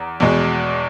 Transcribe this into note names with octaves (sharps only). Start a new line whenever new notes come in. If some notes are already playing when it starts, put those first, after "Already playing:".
Already playing: E2 A#5
E2 B2 G#3